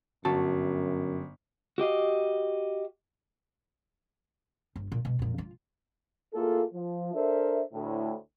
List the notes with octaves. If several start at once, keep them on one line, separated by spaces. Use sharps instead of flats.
G1 F#2 F#4 A5
F#4 G4 D#5 F5
G1
A#2
B2
F2 A#2
F4
A2 A#3 F4 G#4 A4
F3
D4 A4 A#4 C5 E5
D2 A2